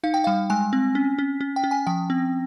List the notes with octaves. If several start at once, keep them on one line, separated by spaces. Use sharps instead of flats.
D#4 F5
G5
G3 F5
G#3 G#5
C4
C#4
C#4
C#4
G5
C#4
G#5
F3 G5
C4